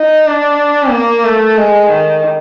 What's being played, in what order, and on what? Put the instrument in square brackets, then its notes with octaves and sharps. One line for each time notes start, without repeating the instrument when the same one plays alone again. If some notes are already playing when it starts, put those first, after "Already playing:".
Already playing: [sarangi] D#4
D4
A#3
A3
G#3
D#3